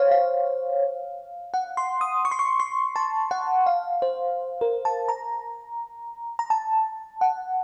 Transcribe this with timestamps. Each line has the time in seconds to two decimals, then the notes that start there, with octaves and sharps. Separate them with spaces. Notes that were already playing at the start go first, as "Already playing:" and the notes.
Already playing: C5 C#5 F5
0.11 F5
1.54 F#5
1.77 C6
2.01 D#6
2.25 C#6
2.31 C6
2.39 C#6
2.60 C6
2.96 A5
3.31 F#5
3.66 F5
4.02 C5
4.61 A#4
4.85 A5
5.09 A#5
6.39 A#5
6.50 A5
7.21 F#5